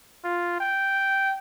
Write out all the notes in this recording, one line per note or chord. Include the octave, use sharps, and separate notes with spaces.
F4
G5